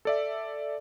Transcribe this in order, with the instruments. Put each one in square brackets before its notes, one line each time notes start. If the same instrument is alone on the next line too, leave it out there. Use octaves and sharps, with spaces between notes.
[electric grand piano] A4 D5 E5